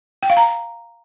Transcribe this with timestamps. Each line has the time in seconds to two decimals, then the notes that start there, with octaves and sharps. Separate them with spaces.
0.23 G5
0.30 F5
0.37 A#5